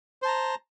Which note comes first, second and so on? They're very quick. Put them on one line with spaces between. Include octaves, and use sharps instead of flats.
C5 A5 A#5